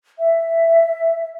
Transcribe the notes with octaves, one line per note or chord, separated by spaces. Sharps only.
E5